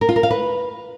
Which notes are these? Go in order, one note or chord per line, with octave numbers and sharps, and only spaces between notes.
A#4
F4
A#4
F5
B4